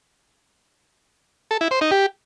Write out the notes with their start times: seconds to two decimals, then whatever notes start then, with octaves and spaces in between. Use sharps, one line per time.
1.51 A4
1.61 E4
1.71 C5
1.81 D#4
1.91 G4